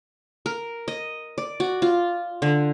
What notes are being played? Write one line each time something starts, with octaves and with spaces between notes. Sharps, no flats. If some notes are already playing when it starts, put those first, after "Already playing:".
A#4
D#5
D5
F#4
F4
D3